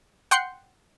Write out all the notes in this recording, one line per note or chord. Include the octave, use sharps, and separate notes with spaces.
F#5 G5 C6 C7 C#7